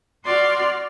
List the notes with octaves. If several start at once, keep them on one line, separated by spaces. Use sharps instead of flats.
F#4 D5 C6 F6